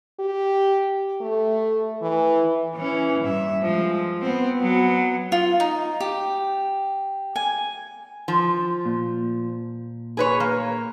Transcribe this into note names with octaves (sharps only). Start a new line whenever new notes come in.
G4
A3
E3
E3 C#4
G2 E5
F3 G#3
B3 C4
F#3 B3
F4
D#4
G4
G#5
F3
A#2
G#4 B4 C#5
A#3